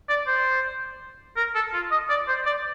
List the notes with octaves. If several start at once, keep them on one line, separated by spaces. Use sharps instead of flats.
D5
C5
A#4
A4
F4
D#5
D5
C5
D5